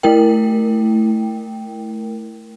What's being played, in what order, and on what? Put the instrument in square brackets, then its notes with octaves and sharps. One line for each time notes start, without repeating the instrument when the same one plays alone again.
[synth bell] A3 E4 A#4 G5